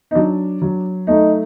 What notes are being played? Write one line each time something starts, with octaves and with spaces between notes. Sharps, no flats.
D#4
F#3 D4
F#3
A3 D#4